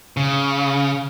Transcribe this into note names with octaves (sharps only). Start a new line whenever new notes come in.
C#3